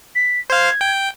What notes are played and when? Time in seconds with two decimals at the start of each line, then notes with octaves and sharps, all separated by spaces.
0.15 B6
0.50 C5 F5 G#6
0.81 G5